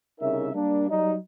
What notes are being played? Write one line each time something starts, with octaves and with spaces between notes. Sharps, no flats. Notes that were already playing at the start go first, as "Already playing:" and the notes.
C2 C#3 D#4 A#4 E5
G3 A#3 D4
F#3 G3 D#4